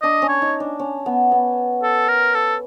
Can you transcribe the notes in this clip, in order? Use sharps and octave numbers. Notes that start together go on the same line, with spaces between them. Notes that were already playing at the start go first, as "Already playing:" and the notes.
D4 D#5
C#4
C#5
D#4
D4
C#4
B3
B3
A4
A#4
A4